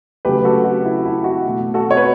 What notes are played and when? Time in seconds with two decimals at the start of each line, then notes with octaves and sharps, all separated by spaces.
0.25 C#3 F#3 A3 G4 B4
0.45 F#4 A4
0.64 F#4
0.85 E4
1.05 E4
1.24 F#4
1.45 B2 A3
1.74 F#4 A4
1.91 C#5
1.97 B4